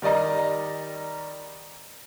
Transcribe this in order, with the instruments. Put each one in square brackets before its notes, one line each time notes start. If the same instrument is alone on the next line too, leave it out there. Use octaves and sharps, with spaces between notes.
[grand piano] D#3 G3 D5 D#5 A#5